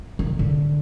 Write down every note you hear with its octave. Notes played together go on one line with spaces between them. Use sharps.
D#3
D3